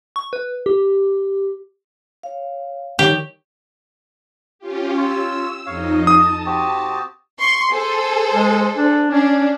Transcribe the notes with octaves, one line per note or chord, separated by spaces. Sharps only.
C#6
B4
G4
C#5 F5
D#3 G3 D#4 G4 C#5 C#6
C#4 F4 G4
F4 C#5 E6
F2 D#4 C#5 D#5 F5
A5 D#6
C4 F#4 G4
C6 C#6
G#4 A4 C5
G#3
D4
C#4 D4